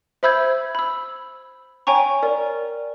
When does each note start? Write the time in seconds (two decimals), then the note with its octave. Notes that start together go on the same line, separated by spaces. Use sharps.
0.23 C5 E5 B5 E6 G6 G#6
0.75 B5 E6
1.87 C#5 G5 G#5 A#5 C#6
2.23 A#4 D5